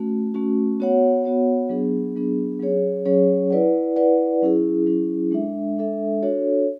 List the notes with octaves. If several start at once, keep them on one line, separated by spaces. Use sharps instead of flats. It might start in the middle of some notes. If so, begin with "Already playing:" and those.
Already playing: A3 C#4 F#4
A3 C#4 F#4
B3 F#4 C#5 F#5
B3 F#4 C#5 F#5
F#3 B3 D4 G#4
F#3 B3 D4 G#4
F#3 C#4 G#4 C#5
F#3 C#4 G#4 C#5
E4 B4 D5 F#5
E4 B4 D5 F#5
F#3 C#4 E4 G#4
F#3 C#4 E4 G#4
G#3 D4 A4 E5
G#3 D4 A4 E5
D4 F#4 A4 C#5